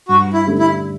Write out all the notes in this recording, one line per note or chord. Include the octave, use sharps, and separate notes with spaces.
G2 F#4
E4
D3 A3 C#4 G4
E4